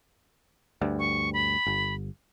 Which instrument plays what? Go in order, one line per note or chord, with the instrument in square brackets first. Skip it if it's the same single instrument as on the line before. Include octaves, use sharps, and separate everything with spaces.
[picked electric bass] D2 G2
[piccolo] C#6
B5
[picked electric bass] G1